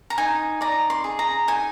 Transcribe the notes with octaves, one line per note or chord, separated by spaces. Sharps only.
A#5
D#4 G#5
D5 A#5
C6
G#4
A#5
D#4 G#5